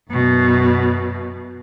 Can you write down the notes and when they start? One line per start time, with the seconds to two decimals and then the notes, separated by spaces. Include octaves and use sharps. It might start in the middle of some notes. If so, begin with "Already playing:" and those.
0.11 F#2 B2